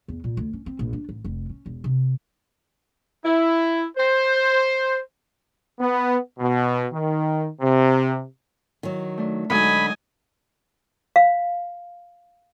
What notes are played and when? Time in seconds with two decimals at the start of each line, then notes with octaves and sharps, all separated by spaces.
0.08 E2
0.24 A#2
0.37 D2
0.53 C#4
0.66 C4
0.79 A#1
0.93 D4
1.09 A1
1.24 F1
1.49 C#4
1.66 E1
1.84 C3
3.25 E4
3.97 C5
5.80 B3
6.39 B2
6.92 D#3
7.61 C3
8.83 D#3 F#3
9.18 A3 D4
9.50 D3 F#3 G#3 D#4 D#5 G#5 B5
11.16 F5